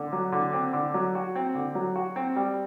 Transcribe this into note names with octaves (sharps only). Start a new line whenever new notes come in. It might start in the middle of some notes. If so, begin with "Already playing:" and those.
Already playing: D3
F#3
D3
C4
D3
F#3
F#4
C4
D3
F#3
F#4
C4
G3